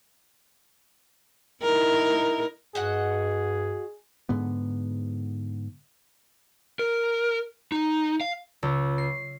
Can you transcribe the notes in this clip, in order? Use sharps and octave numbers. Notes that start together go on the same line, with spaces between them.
D#4 E4 A#4
G2 F#4 G#4 D#5 F#5
G#2 D3 B3
A#4
D#4
F5
C#2
C7